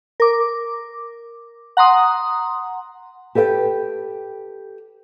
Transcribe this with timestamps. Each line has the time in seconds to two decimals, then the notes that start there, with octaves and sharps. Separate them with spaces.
0.20 A#4 D6
1.77 F#5 A#5 C6 D#6
3.35 G4 A4 B4 E5 G5